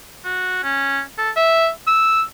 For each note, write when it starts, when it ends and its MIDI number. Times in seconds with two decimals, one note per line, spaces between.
0.25 0.59 66
0.63 1.02 61
1.18 1.30 69
1.36 1.69 76
1.87 2.23 88